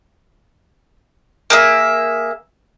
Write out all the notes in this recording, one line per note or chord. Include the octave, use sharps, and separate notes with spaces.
A#3 G#4 E5